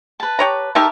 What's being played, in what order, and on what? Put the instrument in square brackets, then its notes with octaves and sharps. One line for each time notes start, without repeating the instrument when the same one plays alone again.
[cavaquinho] B4 A5
[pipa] G4 C#5 A#5
[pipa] A3 D#4 G4 [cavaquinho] A#4 E5 A5